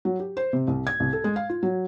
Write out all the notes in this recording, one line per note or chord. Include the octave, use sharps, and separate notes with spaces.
F#3
G4
C5
C3
C2
G#6
C2
A4
G#3
F5
F4
F#3